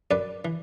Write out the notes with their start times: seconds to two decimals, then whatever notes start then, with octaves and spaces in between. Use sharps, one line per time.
0.11 F#2 B4 D5
0.45 E3